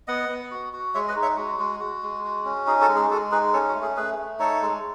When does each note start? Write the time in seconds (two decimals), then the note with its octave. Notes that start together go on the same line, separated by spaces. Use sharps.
0.07 B3 D#5 F#5
0.29 B3
0.51 F#4
0.73 F#4
0.95 G#3 C#5 E5
1.08 B4 D#5
1.16 D#4
1.22 C#5 E5
1.37 G#3 F#4
1.59 G#3
1.80 F#4
2.03 G#3
2.24 F#4
2.45 C#4
2.67 D#4 G#4
2.81 F#4 A4
2.88 G#3
2.96 G#4
3.10 G#3 F#4 A4
3.31 D#4 G#4 B4
3.53 C#4 A4 C#5
3.68 F#4
3.75 A3
3.82 G#4
3.97 A3 G#4 B4
4.19 A3
4.39 D#4 A4 C#5
4.62 G#3